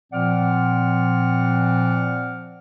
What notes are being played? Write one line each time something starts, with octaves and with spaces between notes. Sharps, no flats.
A#2 F3 C4 D5 F#5 F6